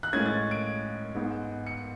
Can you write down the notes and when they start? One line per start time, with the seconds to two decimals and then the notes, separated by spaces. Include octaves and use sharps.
0.03 F#6
0.13 A2 G#3 C#4 G#6
0.26 A6
0.51 D7
1.15 G#2 G#3 B3
1.67 C#7